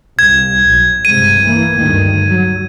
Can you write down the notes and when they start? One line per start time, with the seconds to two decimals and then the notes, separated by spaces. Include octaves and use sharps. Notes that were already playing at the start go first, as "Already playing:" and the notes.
0.19 C2 G#6
0.68 B1
1.05 G2 C3 G#3 D#7
1.42 E3 A#3
1.78 D2 G2 D#3
2.27 F#3